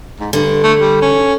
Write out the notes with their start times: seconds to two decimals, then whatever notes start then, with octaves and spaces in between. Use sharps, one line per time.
0.20 G#2
0.33 G2 D3
0.64 A3
0.79 G3
1.02 C#4